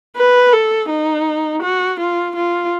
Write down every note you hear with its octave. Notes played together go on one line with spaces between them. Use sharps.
B4
A4
D#4
F#4
F4
F4